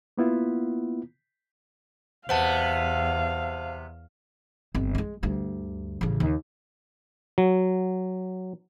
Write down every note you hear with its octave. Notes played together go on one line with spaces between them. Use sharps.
A#3 B3 E4 F4
E2 C3 B3 C5 F5 F#5 A5
G1 C4
G#3 A3
D2 G2
A1 C#3
D#2
F#3